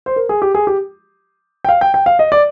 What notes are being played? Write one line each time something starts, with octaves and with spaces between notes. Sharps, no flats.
C5
A#4
G#4
G4
G#4
G4
G5
F5
G5
G5
F5
D#5
D5